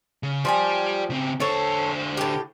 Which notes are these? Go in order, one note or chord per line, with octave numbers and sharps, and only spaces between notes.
C#3
F3 G4 C#5 D5 G#5
C#3 C4
D3 A4 C5 C#5
A2 G4